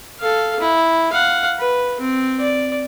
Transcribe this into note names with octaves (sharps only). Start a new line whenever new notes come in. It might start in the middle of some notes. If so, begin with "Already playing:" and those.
A4 F5
E4
F5 F#5
B4
C4
D5